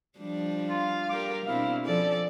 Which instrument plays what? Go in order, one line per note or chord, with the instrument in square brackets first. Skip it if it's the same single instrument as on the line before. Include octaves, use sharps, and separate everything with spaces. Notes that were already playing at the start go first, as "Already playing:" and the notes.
[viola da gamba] F3 G3 D4
[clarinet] F4 [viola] F5
[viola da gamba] G3 G4 A#4 [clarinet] D6
[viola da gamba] B2 C4 D4 [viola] E4 [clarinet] F5
[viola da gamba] F3 [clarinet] C#4 [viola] A4 D5